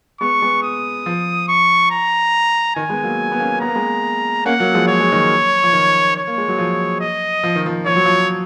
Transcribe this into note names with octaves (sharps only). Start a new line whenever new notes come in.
G#3 B3 C#6
G#3 B3
D#6
F3
C#6
A#5
D#3 G#5
G#3 B3
F#3 A#3
B3
A#3 C#4
B3 A#5
A#3
G#3 B3
A#3 C#4 F#5
F#3 A#3
F3 G#3
F#3 C#5
G#3
D#3 F#3
F3
D#3
C#5
A#3
G#3
F#3
F3
D#5
F3
D#3
F3
F3 C#5
F#3
F3